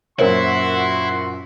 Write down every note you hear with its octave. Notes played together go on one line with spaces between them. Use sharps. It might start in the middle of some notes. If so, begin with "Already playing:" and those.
F#2 A#2 E4 F#4 A#4 C5 C#5 C6